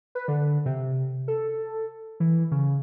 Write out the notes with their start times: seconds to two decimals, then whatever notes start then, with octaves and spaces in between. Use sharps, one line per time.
0.15 B4
0.28 D3
0.66 C3
1.28 A4
2.20 E3
2.51 C#3